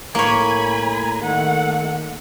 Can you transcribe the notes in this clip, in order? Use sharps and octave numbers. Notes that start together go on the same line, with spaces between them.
A2 A#3 C#5 G#5 B5
D#3 A3 F#5